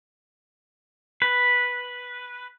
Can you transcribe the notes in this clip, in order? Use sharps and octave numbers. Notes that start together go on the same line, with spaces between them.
B4